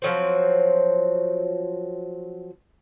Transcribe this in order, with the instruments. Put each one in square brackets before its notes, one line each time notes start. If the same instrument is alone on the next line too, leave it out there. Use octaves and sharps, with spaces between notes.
[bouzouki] F3 F#3 C4